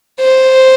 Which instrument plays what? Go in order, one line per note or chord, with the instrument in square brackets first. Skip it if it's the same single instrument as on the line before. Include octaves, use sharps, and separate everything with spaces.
[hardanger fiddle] C5